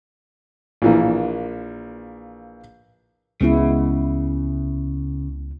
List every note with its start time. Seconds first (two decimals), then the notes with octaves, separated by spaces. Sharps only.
0.82 A#1 E3 A#3
3.41 C#2 C#3 G#3 B3 E4